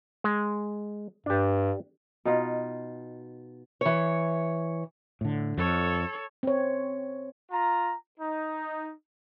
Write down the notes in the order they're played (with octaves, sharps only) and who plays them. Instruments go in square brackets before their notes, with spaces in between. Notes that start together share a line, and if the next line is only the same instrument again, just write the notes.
[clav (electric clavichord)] G#3
[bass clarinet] G2 [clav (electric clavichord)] D4 G4
[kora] B2 D#4 F4
[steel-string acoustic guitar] E3 C#5
[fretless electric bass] A2 D3
[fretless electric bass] F2 [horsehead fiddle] A4 C#5
[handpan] C4 C#5
[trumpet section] F4 A#5
D#4